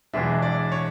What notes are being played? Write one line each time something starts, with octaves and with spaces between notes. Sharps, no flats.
E2 B2 G#3 D4 E5
D5
C#5